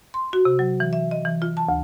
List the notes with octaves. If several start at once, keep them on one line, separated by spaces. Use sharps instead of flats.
C6
F#4
C3
F#3
E3
E5
D#5
E3
F4
A5
D2